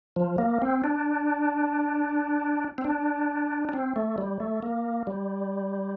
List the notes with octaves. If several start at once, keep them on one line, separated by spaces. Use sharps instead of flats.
F3
A#3
C4
D4
C4
D4
D4
C4
A3
G3
A3
A#3
G3